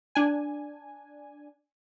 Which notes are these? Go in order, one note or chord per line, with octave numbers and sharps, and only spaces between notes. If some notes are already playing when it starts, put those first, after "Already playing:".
D4 G#5